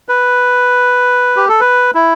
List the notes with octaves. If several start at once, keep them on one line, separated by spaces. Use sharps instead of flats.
B4
G4
A4
B4
E4